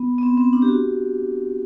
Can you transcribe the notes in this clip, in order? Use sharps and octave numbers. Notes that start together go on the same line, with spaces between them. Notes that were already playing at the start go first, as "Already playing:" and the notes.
Already playing: B3
B3
C4
C4
D4
G4
F#4